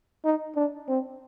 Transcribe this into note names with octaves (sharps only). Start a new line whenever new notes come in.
D#4
D4
C4